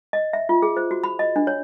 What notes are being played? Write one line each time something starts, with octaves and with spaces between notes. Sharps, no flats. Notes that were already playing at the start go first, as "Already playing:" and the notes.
D#5
E5
F4
G#4
C5
F#4
B5
D#5
D4
C#5